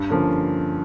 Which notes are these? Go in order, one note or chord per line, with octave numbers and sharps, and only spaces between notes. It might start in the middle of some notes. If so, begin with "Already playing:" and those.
Already playing: G2
D3 F3 A#3 C#4